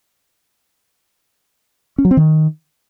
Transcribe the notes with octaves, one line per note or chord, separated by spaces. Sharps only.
C#4
F#3
C4
D#3